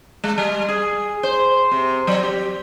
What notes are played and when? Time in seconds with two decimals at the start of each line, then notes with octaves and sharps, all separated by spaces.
0.24 G#3
0.38 G3
0.68 G#4
1.23 C5
1.71 C3
2.07 F#3
2.23 G4